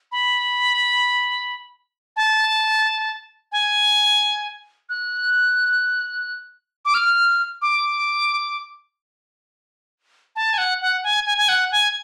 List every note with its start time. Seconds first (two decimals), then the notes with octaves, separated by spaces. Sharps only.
0.12 B5
2.16 A5
3.52 G#5
4.89 F#6
6.85 D6
6.94 F6
7.62 D6
10.36 A5
10.53 G#5
10.58 F#5
10.81 F#5
11.04 G#5
11.26 G#5
11.38 G#5
11.49 F#5
11.72 G#5